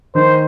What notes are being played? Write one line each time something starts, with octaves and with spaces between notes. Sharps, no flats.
D#3 C5